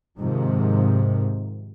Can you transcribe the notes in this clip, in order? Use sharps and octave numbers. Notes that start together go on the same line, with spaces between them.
G#2 C3 D#3 F3